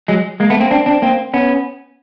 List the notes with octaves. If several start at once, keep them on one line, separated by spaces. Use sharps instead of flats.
F#3 G#3
G#3 A#3
A3 B3
A#3 C4
C4 D4
C4 D4
A#3 C4
B3 C#4